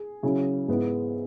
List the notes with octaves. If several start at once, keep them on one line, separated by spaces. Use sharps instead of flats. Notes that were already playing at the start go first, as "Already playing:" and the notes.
Already playing: G#4
C#3 F#3 C#4 E4
G#2 G#3 B3 E4